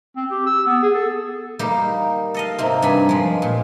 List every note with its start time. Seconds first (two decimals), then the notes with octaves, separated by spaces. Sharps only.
0.16 C4
0.31 G4
0.46 E6
0.66 B3
0.83 G#4
0.94 A4
1.59 G3 A#3 D#4 G4
2.34 A4 D#5 F5
2.58 G#2 C3 A#3 C4
2.82 G2 G#5 B5
3.09 F3 G#3
3.42 A#2